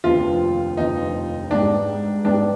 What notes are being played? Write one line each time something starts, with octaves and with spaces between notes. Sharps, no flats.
F1 D#2 D3 F3 B3 F4
F1 D#2 D3 F3 B3 D#4
G#2 G3 B3 D4
G#2 G3 B3 D4